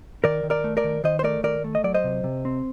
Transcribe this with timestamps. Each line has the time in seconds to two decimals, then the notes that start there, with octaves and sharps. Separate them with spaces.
0.24 D#3 A#4 D5
0.43 D#3
0.50 A#4 D5
0.64 A3
0.77 A#4 D5
0.84 D#3
1.04 D#3 C5 D#5
1.19 C5
1.23 A3 A#4 D5
1.43 D#3 A#4 D5
1.64 A3
1.75 D#5
1.84 F#3 D5
1.94 C5 D#5
2.04 C3
2.24 C3
2.45 C4